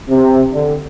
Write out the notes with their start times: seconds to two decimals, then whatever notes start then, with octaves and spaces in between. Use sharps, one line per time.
0.10 C3
0.53 D3